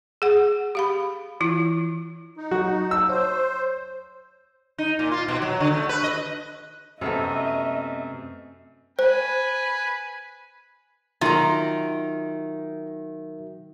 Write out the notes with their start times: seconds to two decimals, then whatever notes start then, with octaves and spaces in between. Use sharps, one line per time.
0.22 G#4 F#5
0.75 G4 F5 B5
1.40 E3 E4 F4
2.37 D#4
2.51 F#3 F#4
2.91 E6
3.09 C5 C#5
4.78 D#4
4.99 A#2
5.11 F4
5.28 B2
5.42 F#3
5.60 D3
5.72 A3
5.89 B4
6.03 D#5
7.01 F#2 C3 A3 B3 D#5 E5
8.99 B4 C5 G#5
11.21 D#3 F#3 F4 F#4 E5 A#5